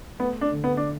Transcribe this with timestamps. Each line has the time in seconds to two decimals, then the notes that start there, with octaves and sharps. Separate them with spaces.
0.19 A3 B3
0.41 D4
0.52 D3
0.64 B3
0.77 D4